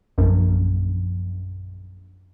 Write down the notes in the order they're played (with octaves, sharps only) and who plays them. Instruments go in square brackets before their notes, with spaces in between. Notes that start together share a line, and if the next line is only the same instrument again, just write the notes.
[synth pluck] A#1 F#2